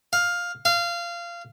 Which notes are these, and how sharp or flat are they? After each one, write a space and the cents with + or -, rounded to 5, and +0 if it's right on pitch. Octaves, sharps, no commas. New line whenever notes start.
F5 +10
F5 -20